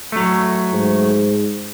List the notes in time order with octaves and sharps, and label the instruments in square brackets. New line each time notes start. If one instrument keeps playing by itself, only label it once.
[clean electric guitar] F#3 A3
[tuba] G#2